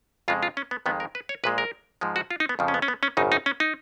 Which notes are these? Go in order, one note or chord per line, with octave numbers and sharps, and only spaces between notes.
F2 C#3 G#3 F4
F4
C#4
B3
F2 D#3 G#3 B3
A#4
B4
C#5
A#1 A#2 G#3 B4
A#4
G#2 F3 G#3
F#4
F4
D#4
B3
F2 C#3 F3
C#4
B3
C#4
B3
C#4
G#1 F#2 C#3 D#4
D#4
C#4
D#4